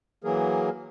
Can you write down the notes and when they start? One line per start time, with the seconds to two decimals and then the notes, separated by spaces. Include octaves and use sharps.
0.24 E3 F#3 A#3 G#4 A#4